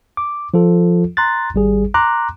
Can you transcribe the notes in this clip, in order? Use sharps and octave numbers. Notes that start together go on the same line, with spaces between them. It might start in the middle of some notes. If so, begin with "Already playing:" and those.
D6
F3 F4 A4
A#5 C6 F#6 A6
G#1 G3 G#4
A#5 C6 D6 F#6